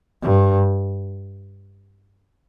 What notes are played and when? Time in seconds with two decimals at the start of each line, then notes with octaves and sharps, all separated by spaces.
0.22 G2